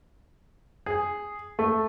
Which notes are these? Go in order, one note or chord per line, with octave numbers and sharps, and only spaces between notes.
G#4
A3